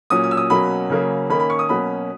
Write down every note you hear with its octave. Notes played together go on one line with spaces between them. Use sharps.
A#2 F#3 C#4 D#6
D#6
E6
D#6
B2 F#3 A#3 C#4 B5
C#3 F#3 A#3 C#4
D#3 A#3 C#4 B5
B5
C#6
D#6
B2 F#3 A#3 C#4 B5